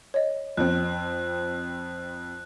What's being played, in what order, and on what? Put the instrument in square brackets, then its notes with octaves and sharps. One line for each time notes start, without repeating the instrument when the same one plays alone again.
[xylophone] C#5 D#5
[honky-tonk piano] F2 C4 [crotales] F#6